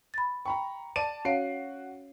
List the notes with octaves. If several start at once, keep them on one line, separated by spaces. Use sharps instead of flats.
B5 A6
G5 A#5 B5 C#6
D5 A5 D#7
C#4 F#4 C#5 F5 C7 D7